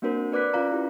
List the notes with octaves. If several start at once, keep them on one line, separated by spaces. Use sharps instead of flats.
A#3 C4 D4 F#4 A#4 C5
B4 D5 D6 F#6 B6
C#4 F4 F5 A#5
E4 G4